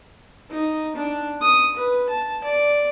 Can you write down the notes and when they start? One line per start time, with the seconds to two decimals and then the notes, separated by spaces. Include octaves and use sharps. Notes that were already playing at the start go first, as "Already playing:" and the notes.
0.50 D#4
0.96 D4
1.41 D#6
1.77 B4
2.09 A5
2.44 D5